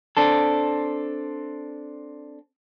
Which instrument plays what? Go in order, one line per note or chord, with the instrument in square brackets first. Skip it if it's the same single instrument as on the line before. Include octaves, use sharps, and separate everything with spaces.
[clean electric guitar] C4 D4 A4